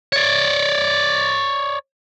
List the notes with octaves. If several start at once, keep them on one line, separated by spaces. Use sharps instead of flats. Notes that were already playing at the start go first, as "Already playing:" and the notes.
C#5 D5